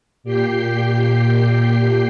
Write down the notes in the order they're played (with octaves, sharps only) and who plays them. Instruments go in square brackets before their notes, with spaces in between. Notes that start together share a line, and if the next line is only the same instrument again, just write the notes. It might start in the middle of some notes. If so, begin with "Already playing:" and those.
[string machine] A#2 G4 G5 C7